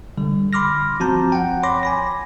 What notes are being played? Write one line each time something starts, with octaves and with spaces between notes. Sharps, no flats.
D3 G3
B5 C6 D6 F6 A#6
F3 C4 F#4 A5 A#5 G6
F#5 G5
C#5 B5 C6 D6 A#6
G#5 B5 A#6